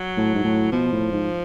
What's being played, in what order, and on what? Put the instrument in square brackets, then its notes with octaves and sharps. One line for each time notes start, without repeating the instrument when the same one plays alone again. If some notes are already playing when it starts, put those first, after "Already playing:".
Already playing: [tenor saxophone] F#3
[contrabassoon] A2
G#2
A2
[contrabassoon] B2 [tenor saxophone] F3
[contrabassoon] A2
G#2